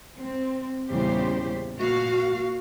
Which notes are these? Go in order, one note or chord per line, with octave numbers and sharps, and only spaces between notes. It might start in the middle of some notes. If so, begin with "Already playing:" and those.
C4
E2 A#2 C#3 G3 G4 C5
A#2 F#4 F5